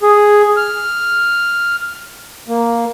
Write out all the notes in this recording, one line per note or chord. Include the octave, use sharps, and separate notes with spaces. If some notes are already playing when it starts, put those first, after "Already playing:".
G#4
F6
A#3